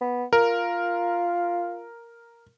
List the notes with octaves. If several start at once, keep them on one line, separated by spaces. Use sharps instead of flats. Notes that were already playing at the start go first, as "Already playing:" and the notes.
B3
F4 A#4